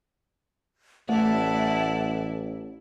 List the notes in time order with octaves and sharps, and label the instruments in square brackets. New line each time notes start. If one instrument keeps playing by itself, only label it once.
[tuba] A1 [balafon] A3 [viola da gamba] E4 D5 [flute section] E5 F#5 A5